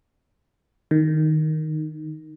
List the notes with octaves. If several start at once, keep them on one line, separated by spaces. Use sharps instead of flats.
D#3